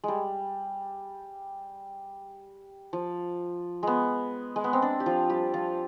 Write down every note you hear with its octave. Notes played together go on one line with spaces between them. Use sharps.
G3 G#3
F3
G#3 B3
G#3
B3
C4
D4
G4
F3 F4
G3 G4
F3 F4